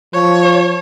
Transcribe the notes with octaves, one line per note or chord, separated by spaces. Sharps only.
F3 C#5